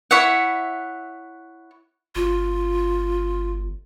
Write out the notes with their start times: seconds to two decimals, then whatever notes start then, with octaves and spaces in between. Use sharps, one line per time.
0.11 E4 C#5 E5 F#5
2.15 G1 F4